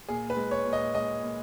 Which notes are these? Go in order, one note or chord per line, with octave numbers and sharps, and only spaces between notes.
A#2 G#4
B4
G#3
C#5
A#2
D#5
G#3 D#5
A#2